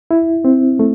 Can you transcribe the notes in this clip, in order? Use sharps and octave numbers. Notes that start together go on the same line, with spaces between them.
E4
C4
A3